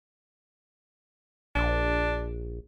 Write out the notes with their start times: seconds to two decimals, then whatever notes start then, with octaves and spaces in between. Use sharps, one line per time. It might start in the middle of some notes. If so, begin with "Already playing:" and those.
1.56 A#1 D4